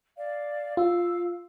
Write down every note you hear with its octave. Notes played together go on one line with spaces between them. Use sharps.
D5 F5
F4 F5 E6